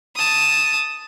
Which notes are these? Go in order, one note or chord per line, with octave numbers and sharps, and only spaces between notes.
A5 D#6